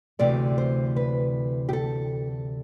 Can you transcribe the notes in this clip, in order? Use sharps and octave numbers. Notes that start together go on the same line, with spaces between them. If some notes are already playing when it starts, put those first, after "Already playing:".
D2 C3 E3 A3 D5
C5
B4
G4
A4